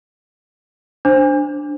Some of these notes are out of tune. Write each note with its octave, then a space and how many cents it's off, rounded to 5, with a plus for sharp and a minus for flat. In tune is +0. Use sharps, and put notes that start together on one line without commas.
D4 +0 C5 +0